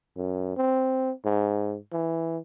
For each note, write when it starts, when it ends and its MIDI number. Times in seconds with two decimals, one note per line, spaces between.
0.17 0.54 42
0.57 1.11 60
1.25 1.76 44
1.93 2.38 52